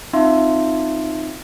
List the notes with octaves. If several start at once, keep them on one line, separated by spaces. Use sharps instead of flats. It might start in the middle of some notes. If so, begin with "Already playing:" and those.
C4 D#4 F4 E5 F5 C6